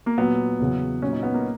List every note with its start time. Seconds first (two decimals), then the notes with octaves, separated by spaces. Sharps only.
0.06 A#3
0.18 A#2 F#3 B3
0.60 E2 C#3 F#3
1.02 A#2 C#4
1.06 F#3
1.13 D#4
1.23 B3
1.34 A#3